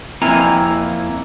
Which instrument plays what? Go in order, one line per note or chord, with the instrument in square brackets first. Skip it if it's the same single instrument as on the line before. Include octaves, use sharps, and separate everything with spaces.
[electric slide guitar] F2 A#3 C4 E4 G#5 A#5